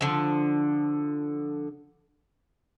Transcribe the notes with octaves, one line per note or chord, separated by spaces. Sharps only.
D3 F3